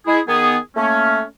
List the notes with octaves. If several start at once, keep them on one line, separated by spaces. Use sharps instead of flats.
G#3 E4 G#4
D#3 B3 G#4
A3 A#3 C#4